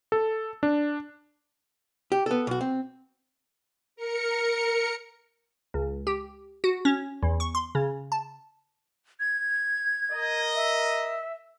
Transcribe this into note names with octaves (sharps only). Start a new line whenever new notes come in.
A4
D4
G4
B3 A4
B1 F#4
C4
A#4 C#7
C#2
G4
F#4
C#4
E2
C#6
C6
C#3
A5
G#6
A#4 D#5
E5